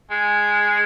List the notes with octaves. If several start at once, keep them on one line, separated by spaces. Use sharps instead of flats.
G#3